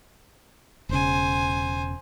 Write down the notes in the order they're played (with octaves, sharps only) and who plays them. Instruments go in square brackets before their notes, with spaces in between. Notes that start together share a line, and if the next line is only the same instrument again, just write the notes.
[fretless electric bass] E1 C#3 [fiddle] C5 G#5